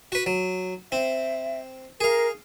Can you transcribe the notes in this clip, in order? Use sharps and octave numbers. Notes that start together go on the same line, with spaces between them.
F#4 B4
F#3
C4 E5
G#4 A#4 F5